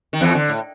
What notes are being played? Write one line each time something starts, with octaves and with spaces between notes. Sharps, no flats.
D#3
E2 E3
D3
A2